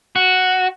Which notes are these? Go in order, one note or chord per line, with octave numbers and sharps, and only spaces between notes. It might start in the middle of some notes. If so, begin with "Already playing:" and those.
F#4